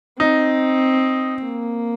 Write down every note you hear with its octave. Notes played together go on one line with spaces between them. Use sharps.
C4 D#4
A#3